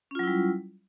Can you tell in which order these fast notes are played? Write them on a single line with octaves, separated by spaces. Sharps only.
C#4 F4 F#3 E4 G3